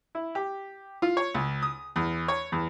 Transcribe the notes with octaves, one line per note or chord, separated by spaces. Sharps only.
E4
G4
F4
C#5
C#2
D#6
E2
C#5
E2